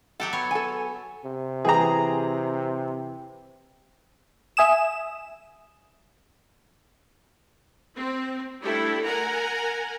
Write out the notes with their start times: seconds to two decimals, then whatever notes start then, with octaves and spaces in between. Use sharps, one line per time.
0.20 F#3 G4 A4 F#5
0.33 B3 C#5
0.51 A4 G#5
1.25 C3
1.65 E3 G#4 G5 A#5
4.57 E5 G#5 D#6 E7
7.96 C4
8.62 G3 A3 D4 E4 G4 A4
9.05 A#4 F#5 G#5 A#5